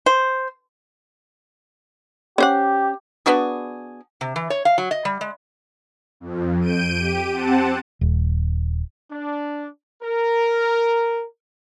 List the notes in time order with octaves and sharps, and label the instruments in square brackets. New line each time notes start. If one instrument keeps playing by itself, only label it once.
[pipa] C5
[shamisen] C#4 C5 F#5 [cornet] G4
[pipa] B3 D4 F#4 G#4
[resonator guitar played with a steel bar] C3
E3
C#5
F5
F#3
D#5
G3
G#3
[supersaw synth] F2
G6 D7 D#7
G4
C4 F#5 A5
[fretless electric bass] D#1
[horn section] D4
A#4